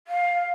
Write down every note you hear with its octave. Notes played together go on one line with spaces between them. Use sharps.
F5